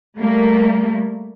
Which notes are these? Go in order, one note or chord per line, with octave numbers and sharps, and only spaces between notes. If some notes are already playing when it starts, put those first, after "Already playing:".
G3 A3 A#3